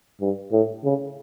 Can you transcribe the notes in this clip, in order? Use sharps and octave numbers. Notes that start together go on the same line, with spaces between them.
G2
A2
C#3